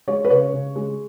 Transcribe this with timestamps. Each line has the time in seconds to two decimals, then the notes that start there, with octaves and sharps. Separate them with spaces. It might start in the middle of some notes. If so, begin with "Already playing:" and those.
0.08 G#3 C#5
0.25 B4
0.30 C#3 C#5
0.53 C#3
0.75 G#3